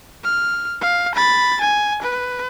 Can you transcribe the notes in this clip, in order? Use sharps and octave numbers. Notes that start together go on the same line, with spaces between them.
F6
F5
B5 A6
G#5
B4